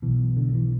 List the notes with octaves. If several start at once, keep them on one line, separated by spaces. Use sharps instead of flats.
B1 B2 E3
D3
E3